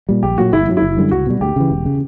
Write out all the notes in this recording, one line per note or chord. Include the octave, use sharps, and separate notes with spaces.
A#2 G3
A#1 G4
A#2 F#3 F#4
G1 E4
F#2 D3 F#3
E4
F#1
F#2 D3 G3
C#2 F#4
B2 G3
D2 G4
C#3 E3
E1
C#3